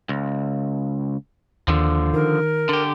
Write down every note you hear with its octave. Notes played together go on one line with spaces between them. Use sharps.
C#2
D#2 D3 F3
D#3 A#4
D3 G4